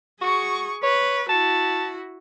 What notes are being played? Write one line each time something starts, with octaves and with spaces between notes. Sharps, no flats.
F#4 G#4 C#6
B4 C#5
E4 F#4 A5